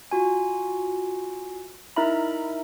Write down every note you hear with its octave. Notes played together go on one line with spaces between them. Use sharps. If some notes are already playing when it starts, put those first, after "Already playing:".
F4 F#4 G#5
D#4 E4 A#4 E5 A#5 B5